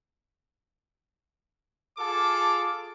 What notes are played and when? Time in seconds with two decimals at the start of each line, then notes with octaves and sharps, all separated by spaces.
1.97 F4 G#4 A4 A5 D6